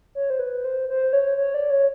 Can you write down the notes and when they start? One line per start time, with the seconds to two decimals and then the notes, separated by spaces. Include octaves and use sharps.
0.15 C#5
0.30 C5
0.39 B4
0.64 C5
0.89 C5
1.13 C#5
1.37 C#5
1.54 D5
1.70 C#5